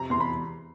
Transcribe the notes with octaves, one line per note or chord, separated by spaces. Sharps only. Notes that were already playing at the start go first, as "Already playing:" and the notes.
Already playing: F2 C3 A#5
E2 C6
B5